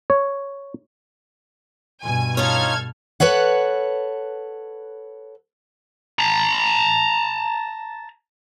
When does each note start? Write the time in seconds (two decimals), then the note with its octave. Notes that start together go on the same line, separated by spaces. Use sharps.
0.10 C#5
2.02 G2 B2 G#5
2.37 C#4 D#4 F4 A4 F6 G#6
3.20 A4 B4 C#5 F#5
6.19 A5 A#5